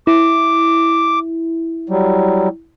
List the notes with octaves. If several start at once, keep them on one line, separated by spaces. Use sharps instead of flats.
E4 D6
F#3 G3